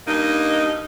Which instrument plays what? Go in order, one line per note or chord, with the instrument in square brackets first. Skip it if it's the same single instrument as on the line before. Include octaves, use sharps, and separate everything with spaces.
[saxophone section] G2 A#3 D#4